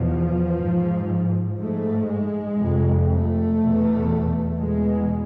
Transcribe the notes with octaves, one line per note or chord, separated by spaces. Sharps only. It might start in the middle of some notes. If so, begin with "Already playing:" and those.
Already playing: E2 B2 F3
G#2
G#2 A3
G#3
F2 C3
A3
E2 B2
E2 B2 G#3